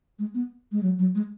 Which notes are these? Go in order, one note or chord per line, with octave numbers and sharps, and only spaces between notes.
G#3
B3
G#3
F#3
F#3
G#3